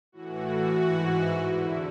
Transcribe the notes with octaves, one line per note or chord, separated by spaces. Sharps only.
A2 E3 F#4
G#2 E3
E2 D3 E4